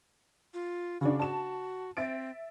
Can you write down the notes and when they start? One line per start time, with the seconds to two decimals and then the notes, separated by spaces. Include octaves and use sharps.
0.54 F4
1.01 C#3 D4 F#4
1.20 F#4 A5 E7
1.97 C4 E5 A6 D7